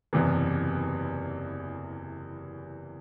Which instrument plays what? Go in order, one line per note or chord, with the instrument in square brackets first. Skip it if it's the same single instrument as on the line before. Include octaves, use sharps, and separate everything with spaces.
[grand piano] F#1 E2 C3 E3